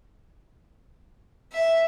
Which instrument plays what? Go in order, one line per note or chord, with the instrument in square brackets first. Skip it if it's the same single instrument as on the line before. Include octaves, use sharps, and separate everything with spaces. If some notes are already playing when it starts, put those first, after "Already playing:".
[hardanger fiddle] E5